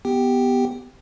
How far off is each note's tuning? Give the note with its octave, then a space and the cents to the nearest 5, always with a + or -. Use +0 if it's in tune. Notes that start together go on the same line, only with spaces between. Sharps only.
B3 +0 G4 +0 G5 +0